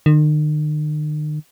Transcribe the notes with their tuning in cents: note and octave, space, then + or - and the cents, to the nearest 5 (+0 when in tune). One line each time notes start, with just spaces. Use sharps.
D#3 -45